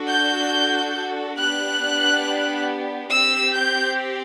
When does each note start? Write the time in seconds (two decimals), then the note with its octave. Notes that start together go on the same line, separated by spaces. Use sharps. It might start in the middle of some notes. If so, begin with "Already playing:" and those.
Already playing: D4 F#4 A4
0.09 G6
1.38 B3 D4 G4 F#6
3.11 C4 G4 E6
3.54 G6